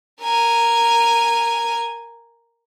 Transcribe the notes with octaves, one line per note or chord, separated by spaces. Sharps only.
A#4 G#5